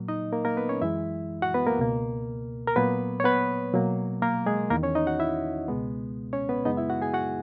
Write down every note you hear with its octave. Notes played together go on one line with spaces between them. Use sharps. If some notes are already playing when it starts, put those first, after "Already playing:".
Already playing: A#2 F#3 A#3
D#4 D#5
A#3 A#4
A#3 A#4
B3 B4
C#4 C#5
F#2 E3 G#3 E4 E5
F#4 F#5
B3 B4
A#3 A#4
C#2 B2 A#3
A#4
A#2 F#3 A#3 B3 B4
C#5
B3 B4
B2 F#3 A#3
A#3 A#4
G#3 G#4
E2 D#3 A#3 A#4
C#4 C#5
D#4 D#5
F#4 F#5
E4 E5
C#2 B2 G#3 B3
C#4 C#5
B3 B4
F#2 C#3 G#3 B3 D#4 D#5
E4 E5
F#4 F#5
G#4 G#5
F#4 F#5